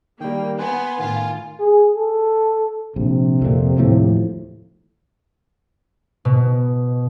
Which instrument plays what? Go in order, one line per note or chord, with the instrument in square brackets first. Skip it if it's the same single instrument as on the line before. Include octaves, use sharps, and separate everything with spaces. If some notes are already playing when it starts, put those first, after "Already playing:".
[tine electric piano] D#3 G3 [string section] A#3 [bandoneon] G5
[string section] B3 [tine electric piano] B4 [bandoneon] G#5 C6
[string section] A2 F4 [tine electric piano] D#3
[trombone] G#4
A4
[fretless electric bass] A#1 [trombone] C3
[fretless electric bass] F2 A#2
D#2 A2 F3
[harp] B2